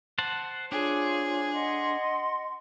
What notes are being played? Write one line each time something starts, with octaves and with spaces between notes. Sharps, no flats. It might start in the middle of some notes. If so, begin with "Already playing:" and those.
C5 F#5 A5
D4 F4 G#4 C5 C#5
D#5 F#5 C6